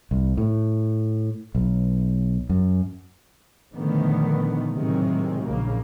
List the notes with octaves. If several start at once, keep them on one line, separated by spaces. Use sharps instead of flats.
C2
A2
B1
F#2
A#2 D3 D#3 F3 A3 B3
A2 C3 D#3 F#3 G#3
A#1 C#3 A#3